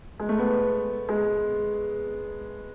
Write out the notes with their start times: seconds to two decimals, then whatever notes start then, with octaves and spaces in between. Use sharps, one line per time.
0.20 G#3
0.29 A3
0.39 B3
1.09 G#3